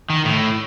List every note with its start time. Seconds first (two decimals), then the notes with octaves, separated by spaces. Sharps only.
0.10 D#3
0.25 A2